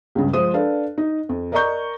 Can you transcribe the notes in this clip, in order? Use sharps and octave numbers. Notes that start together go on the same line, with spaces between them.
C#2 G2 C#3
F3 G#3 G#4 C5 D#6
D4 A4 B4 F5
D#4
F2
A#4 D5 D#5 A#5 C#6 G6